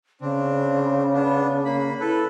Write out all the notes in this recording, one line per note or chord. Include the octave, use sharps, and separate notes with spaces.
C#3 C4 D4
B3 D4
A#3 B5
E4 A4 B4